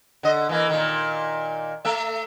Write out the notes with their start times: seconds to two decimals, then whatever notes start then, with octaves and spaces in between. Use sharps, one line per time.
0.23 D3 D#5
0.49 E3 A#3
0.70 A#2 D#3
1.85 A3 E5